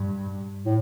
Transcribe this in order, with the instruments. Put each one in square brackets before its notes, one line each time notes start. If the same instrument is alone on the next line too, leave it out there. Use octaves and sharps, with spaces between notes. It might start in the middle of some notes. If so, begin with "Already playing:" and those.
Already playing: [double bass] G2
[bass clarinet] A2